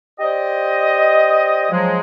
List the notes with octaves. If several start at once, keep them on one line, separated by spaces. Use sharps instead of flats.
G4 C5 D5 D#5
F3 F#3 G#3